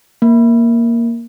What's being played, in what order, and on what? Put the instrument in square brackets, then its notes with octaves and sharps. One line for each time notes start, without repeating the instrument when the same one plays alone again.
[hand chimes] A#3